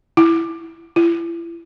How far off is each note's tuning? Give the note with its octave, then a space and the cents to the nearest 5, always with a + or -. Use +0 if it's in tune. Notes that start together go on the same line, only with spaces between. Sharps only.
E4 +10
E4 +40